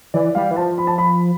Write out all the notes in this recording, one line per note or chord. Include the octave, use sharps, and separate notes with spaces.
E3 D5
G3 F5
E3
F3 A5
B5
A5
B5